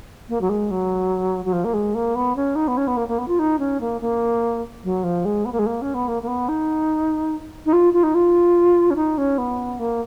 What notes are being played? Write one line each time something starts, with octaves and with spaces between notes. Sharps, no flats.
A#3
F#3
G#3
F#3
F#3
F3
A#3
G#3
A#3
B3
C#4
D#4
B3
C#4
B3
A#3
A#3
B3
F4
D#4
C#4
A#3
A#3
F#3
F3
G#3
B3
A#3
G#3
A#3
C#4
B3
A#3
A#3
B3
D#4
D#4
F4
F4
D#4
F4
C#4
D#4
C#4
B3
A#3